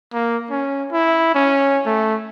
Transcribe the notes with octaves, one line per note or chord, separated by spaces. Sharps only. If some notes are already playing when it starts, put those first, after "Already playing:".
A#3
C#4
E4
C#4
A3